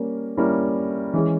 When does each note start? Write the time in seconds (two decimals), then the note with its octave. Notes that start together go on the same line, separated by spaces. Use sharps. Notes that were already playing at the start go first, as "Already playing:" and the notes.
Already playing: G3 A#3 C#4 A#4
0.37 G3 A#3 C#4 E4 A#4
1.14 E3 G#3 C#4